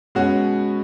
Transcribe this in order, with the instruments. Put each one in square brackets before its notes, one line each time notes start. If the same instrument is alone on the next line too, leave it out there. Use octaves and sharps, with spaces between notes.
[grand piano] B2 G#3 C#4 F#4